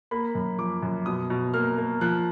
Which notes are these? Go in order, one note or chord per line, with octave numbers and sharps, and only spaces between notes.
A#3 B5
F#2
F3 D6
F#2
B2 D#6
B2
A#3 F6
A#3
F3 F#6